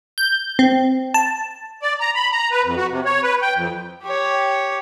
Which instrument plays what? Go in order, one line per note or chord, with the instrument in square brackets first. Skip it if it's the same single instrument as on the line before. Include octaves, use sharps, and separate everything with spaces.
[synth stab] G6
C4
A5
[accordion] D5
A#5
B5
A#5
B4
F2
F#4
C3
C#5
B4
G5
F2
[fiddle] G4 C#5